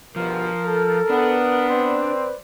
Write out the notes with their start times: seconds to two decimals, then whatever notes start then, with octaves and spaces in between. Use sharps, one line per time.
0.16 G1 B2 F3 A#4
0.64 A4
1.10 B3 D4
1.70 C4 B4 C5 D5